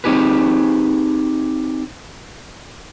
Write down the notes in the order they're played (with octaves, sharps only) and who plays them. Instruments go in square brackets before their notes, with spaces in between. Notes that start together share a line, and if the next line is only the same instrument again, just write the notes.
[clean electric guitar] C4 D#4 G4 G#4 B4